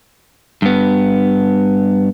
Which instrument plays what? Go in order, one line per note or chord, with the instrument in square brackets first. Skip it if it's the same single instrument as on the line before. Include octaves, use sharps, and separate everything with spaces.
[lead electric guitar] G2 B3